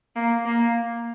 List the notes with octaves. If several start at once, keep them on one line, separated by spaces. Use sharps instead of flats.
A#3
A#3